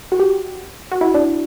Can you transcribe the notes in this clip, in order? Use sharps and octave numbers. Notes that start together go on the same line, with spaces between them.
F#4
G4
F#4
E4
D4